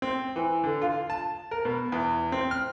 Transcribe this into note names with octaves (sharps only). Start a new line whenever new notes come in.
C4
E3
D3
F4
A5
A#4
B2
E2
C4
F6